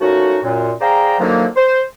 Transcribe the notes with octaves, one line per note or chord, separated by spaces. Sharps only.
A#2 F3 A3 C#4 D#4 F#4
F#2 A#2
G#4 C5 D5 F5 G5 A#5
F#2 D3 D#3 F3 F#3 A#3
C5